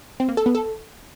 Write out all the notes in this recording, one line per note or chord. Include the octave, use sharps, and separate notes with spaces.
C4
A#3
A4
B3
A4